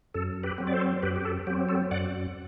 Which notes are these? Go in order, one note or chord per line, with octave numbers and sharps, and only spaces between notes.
F#2 A4
G4 B4
F#3 C4
D5
A4 C5
F#2 G4 B4
G4
A4
F#3 C4 G4
A4
F#2 D5 F#5